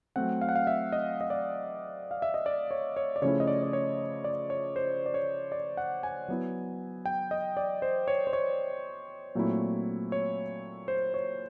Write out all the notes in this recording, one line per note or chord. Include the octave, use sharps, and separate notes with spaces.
F#3 A3 C4 F#5
F5
F#5
F5
E5
D#5
D#5
D5
F5
E5
D#5
D5
C#5
C#5
D5
C#3 F3 A3 C#4 E4 C#5
D#5
D5
D5
C#5
D5
C#5
C5
D5
C#5
D5
F#5
G#5
F#3 B3 E4
G5
D#5
D5
C5
C#5
C5
C#5
A#2 F#3 A3 C4 E4
C#5
C5
C#5